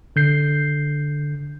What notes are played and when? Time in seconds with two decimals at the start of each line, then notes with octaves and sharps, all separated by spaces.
0.16 D3 G6 C7